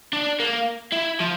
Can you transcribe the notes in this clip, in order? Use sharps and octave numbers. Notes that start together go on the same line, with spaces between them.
D4
A#3
E4
F3